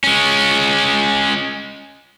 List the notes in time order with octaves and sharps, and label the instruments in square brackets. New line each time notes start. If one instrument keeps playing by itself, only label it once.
[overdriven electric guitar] G#3 C#4